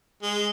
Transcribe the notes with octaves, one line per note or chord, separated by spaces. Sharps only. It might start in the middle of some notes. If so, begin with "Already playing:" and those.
G#3